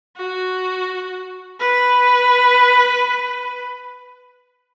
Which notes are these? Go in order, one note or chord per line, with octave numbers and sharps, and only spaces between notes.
F#4
B4